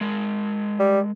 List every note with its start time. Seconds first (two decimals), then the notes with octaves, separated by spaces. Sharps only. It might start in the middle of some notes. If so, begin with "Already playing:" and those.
0.01 G#3 A#4
0.80 G3